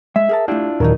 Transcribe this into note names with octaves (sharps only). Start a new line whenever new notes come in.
G#3 E5
G#4 A#4 A5
A3 D4 E4 F4 G4
D#2 A#2 E3 F#3 D#4 A#4